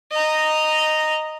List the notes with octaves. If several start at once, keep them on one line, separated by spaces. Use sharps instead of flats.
D#5 A#5